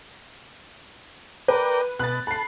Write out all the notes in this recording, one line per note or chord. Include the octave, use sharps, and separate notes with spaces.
A#4 B4 D5 G5
B2 F#6 A6
A4 B5 C7